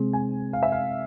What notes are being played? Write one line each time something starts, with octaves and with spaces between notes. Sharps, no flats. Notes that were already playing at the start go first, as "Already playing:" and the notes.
Already playing: C3 G#3 C4 G#4
G#5
F5
E5
F5